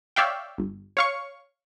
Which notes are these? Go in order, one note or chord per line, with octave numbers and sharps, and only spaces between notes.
C#5 D5 E5 F5 G5
G1
C#5 F5 C#6